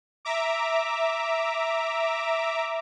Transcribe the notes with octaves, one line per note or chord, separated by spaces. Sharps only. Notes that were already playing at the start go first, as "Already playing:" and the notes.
E5 A#5 D6